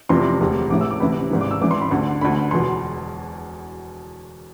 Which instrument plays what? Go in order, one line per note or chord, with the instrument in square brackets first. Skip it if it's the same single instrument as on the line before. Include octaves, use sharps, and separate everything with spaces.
[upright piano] F1 F2 C3 E3 C6
E1 D2 C3
A1 A2 E3 D6
E6
D6
D2 C3 E3 B5
G#1 G#2 E3
D6
E6
G#1 G#2 E3 D6
C6
B5
D2 D3 C6
D2 D3 B5
E1 E2 B2 C6